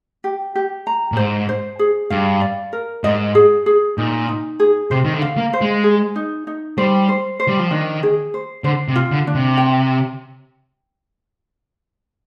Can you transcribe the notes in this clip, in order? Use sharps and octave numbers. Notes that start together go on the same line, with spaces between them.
G4
G4
A#5
A#2
G#2 C5
C5
G#4
G2 F5
D5
A#4
G#2 D#5
G#4
G#4
A#2 D#4
D#4
G#4
C3 C5
D#3
D3
F5
A#3
C5
G#3
G#4
D#4
D#4
G3 C5
C5
C5
G3
F3
D#3 D4
G#4
C5
D3 C5
C3
F4
D3
D4
C3
G5